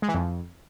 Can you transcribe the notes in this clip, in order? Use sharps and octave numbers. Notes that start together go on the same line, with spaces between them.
G#3
E3
F2